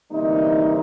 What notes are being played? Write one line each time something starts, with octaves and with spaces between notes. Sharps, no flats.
D2 C3 E3 G3 A#3 D#4